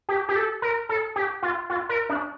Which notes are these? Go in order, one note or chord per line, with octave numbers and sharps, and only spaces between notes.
G4
G4
A4
A#4
A4
G4
F4
F4
A#4
D4